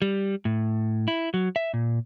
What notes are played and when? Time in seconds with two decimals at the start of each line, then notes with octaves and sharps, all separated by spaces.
0.02 G3
0.45 A2
1.08 E4
1.34 F#3
1.56 E5
1.74 A#2